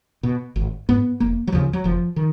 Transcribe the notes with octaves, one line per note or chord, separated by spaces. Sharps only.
B2
G#1
G#2 B3
F1 A#3
F#3
D#2 C#3 F3
F#3
F1 F3
D#3